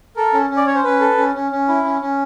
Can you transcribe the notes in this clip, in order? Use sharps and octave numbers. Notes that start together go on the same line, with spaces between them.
A4 A#4
C#4
C#4
D5
C#4 C#5
C5
C#4 B4
A4
C#4
C#4
C#4
E4
C#4
C#4